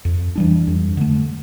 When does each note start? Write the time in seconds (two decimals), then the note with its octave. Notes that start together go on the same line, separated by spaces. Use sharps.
0.05 F2
0.36 E3 G3 D4
0.67 F2
0.97 D3 A3